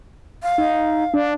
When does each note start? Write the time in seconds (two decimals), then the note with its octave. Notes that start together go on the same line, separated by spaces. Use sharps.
0.43 F5
0.58 D#4
1.14 D4